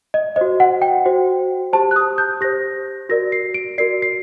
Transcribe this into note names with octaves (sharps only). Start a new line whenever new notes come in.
D#5
F#4 C5 D#5
F#5
G5
F#4 C5
G4 C5 A5
F#6
D#6
G6
G4 C5 A#6
F#4 A#4 D5 A#6
C7
D7
F#4 A#4 D5 C7
C7